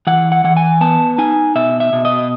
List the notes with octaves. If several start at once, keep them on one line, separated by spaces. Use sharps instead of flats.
E3 F#5
F#5
E3 F#5
G#5
B3 A5
D#4 G#5
B2 E5
E5
B2
D#5